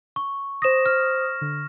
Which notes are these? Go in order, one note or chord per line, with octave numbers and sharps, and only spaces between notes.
C#6
C5 D#6 A#6 E7
F6
D3